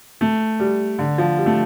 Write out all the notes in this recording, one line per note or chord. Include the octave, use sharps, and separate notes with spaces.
A3
G3
D3
F3
G3
A3